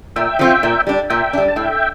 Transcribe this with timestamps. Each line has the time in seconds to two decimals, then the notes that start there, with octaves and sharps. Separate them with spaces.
0.16 A#2 E5 G5
0.39 F3 C4 F4
0.63 A#2
0.87 G3 D4
1.10 A#2 E5 G5
1.33 G3 D4
1.48 A5
1.56 A2 E5 G5